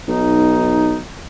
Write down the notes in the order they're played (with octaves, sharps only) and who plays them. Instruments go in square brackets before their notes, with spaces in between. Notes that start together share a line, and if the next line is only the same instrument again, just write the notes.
[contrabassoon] B1 [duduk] D#4